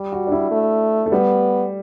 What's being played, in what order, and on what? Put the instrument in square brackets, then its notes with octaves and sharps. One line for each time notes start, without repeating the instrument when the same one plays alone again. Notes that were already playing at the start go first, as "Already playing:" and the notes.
Already playing: [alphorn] G3
[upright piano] F#4
D4
E4
[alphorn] A3
[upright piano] A3
[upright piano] G3 [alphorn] B3